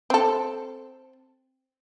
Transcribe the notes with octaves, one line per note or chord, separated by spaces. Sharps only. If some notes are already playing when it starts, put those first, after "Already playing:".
C4 A4